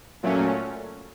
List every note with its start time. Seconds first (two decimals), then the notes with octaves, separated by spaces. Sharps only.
0.23 A#2 F#3 A3 C#4